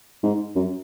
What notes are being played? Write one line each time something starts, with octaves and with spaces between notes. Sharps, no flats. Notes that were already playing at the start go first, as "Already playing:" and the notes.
G#2
F#2